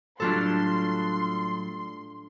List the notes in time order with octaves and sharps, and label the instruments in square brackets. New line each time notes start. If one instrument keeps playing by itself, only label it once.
[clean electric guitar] A2 F#3 G3 [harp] D4 F4 A4 [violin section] C6